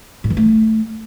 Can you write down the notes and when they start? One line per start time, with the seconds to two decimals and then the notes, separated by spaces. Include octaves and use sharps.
0.24 A2
0.30 E3
0.37 A3